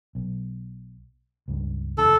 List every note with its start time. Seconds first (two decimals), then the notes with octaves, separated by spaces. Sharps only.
0.15 B1
1.48 C#2 G2
1.98 F1 D#2 D#3 A4